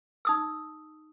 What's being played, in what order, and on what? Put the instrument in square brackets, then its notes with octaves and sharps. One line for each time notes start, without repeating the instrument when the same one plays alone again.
[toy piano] D#4 D#6 E6